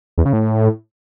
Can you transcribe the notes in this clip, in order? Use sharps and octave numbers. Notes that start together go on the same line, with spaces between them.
E2
C#3
A2